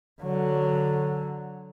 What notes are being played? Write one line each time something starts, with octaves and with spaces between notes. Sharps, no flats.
D3 F#3